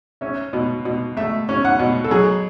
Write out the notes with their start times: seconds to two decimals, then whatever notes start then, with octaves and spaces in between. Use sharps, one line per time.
0.21 C#4 E5
0.53 B2
0.85 B2
1.17 A3 E5
1.49 C#4
1.65 F#5
1.79 B2
2.04 A4
2.11 F#3 G#4